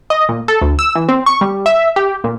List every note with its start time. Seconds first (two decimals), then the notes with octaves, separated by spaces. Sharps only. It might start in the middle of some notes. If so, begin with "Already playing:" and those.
0.10 D#5
0.29 A#2
0.48 A4
0.61 D2
0.79 E6
0.96 E3
1.09 C4
1.26 C#6
1.41 G3
1.66 E5
1.96 G4
2.24 A#2